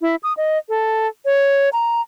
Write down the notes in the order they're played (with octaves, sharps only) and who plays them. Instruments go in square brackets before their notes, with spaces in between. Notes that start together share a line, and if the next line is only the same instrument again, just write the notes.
[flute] E4
D#6
D#5
A4
C#5
A#5